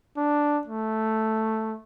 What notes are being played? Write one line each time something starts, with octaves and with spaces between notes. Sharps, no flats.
D4
A3